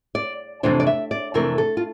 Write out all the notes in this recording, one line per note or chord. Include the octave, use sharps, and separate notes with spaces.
D5
F2 C3 E3 A3 D4 C5
D5
E5
D5
F2 C3 E3 A3 D4 A#4
A4
F4